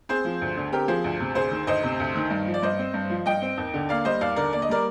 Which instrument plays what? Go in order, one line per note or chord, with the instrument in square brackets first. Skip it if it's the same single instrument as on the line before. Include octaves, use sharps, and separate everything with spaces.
[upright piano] C4 G#4 C5
F3
D2
D3
C4 G4 A#4
F3 G#4 C5
D2
C3
D2 G#4 C5
D#3
D2 C5 D#5
C3
D2
D#3
G2
F3
D5
G2 C5 D#5
C4
G2
F3
G2 D#5 G5
C4
D#2
D3
A#3 D5 F5
G3 C5 D#5
D#2 D5 F5
D3 A#4 D5
A#3 D5
D#5
G3 A#4 D5